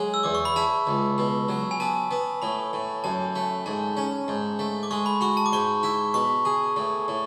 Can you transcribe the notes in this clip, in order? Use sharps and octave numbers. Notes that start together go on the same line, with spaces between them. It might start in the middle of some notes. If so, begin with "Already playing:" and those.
Already playing: F#3 G#3
E6
E2 D6
C#6
B5
E4 A5
C#2
B2
F#3
G#5
B3 A5
B3
A2 B5
A2
F#2 A5
A3
G#2 A5
C#4
G#2
A3
D6
G#3 C#6
B5
F#4 C#6
A5
D6
G#2 C#6
E4
B2 C#6
G#4
A2
A2